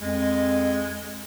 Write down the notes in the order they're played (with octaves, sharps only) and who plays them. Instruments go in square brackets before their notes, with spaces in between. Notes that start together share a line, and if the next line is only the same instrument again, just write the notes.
[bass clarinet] F2 [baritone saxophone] G#3